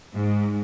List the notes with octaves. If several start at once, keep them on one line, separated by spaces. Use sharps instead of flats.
G#2